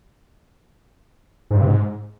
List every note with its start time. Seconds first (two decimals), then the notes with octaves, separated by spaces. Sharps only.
1.51 G#2
1.56 G2
1.61 C3
1.66 G#2